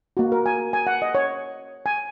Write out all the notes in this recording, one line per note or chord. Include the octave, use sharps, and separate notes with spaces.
A#3 F#4
A#4
G#5
G#5
F#5
D#5
C#5
G#5